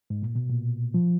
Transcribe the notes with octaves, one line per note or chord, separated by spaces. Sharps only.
G#2
A#2
B2
A#2
F3